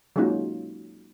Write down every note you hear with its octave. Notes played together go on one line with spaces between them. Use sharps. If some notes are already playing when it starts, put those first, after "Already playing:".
F#3 G#3 A#3 C#4 D#4 F4